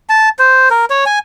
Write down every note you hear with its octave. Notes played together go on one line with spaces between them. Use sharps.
A5
C5
A#4
C#5
G#5